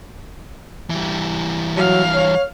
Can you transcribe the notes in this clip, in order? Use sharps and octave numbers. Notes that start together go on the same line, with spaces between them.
E3 G3
F#3 F5
C#5